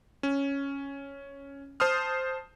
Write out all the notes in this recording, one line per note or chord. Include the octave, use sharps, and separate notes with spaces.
C#4
C5 A5 C6 D#6 F6